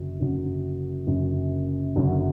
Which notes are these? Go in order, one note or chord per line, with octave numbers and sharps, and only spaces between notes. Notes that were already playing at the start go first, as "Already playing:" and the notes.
Already playing: F#1 F#2 D3 F#3 C#4
F#1 F#2 D3 F#3 C#4
F#1 F#2 D3 F#3 C#4
F#1 F#2 D3 F#3 C#4